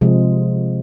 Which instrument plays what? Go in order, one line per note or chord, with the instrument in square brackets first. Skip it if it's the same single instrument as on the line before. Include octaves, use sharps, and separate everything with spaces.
[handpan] C3 F3 G#3